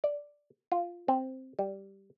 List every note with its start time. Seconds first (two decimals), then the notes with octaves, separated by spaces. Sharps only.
0.04 D5
0.72 F4
1.08 C4
1.59 G3